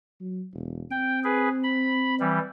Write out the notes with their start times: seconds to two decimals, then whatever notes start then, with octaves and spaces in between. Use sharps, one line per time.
0.20 F#3
0.54 E1
0.91 C4 G5
1.24 G#4 B4
1.64 B5
2.20 E3 G3